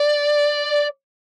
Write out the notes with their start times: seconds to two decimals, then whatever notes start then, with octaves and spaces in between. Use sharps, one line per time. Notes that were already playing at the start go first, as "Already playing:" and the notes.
Already playing: D5